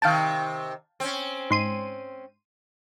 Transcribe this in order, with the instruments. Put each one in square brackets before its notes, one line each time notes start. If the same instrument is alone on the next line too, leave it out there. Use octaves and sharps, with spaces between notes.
[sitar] C3 D#3 [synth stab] F5 G5 A5
[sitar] C4 C#4
[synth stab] G#2 C6 D#7